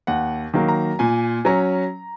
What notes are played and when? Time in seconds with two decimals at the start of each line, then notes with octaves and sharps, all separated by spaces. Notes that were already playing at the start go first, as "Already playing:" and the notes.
0.07 D#2 F#5
0.54 D#3 F#3 A#3
0.68 A#5
0.99 A#2 G#5
1.45 F#3 C#4 A#5